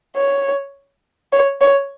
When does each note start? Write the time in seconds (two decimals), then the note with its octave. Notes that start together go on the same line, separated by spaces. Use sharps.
0.16 C#5
1.32 C#5
1.61 C#5